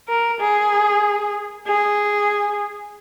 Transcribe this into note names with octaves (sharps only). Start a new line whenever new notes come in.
A#4
G#4
G#4